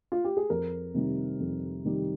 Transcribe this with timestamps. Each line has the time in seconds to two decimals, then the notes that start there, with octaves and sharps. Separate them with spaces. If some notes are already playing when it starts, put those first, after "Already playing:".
0.12 F4
0.24 G4
0.37 G#4
0.50 F2 A#4
0.94 C3 D#3 G3
1.40 F2
1.84 C3 D#3 G3